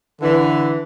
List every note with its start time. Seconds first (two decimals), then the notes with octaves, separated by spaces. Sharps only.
0.21 D3 E3